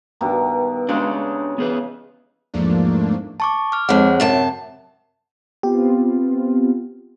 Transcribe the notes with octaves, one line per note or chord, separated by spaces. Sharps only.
G2 B2 D#3
C#3 G#3 D4 F#4
B3 G#4 B4
E2 G#2 F3 A3 A#3 D4
A5 C#6 D6
D6 F6
F2 G#3 C4 C#5 F#5
F#2 C3 A5
B3 C4 F4 G4